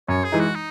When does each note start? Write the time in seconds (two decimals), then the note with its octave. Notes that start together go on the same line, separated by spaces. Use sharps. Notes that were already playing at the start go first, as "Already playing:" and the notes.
0.09 F#2 C#5
0.24 G#4
0.32 E3 G#3 D#4
0.40 F#4
0.56 D#4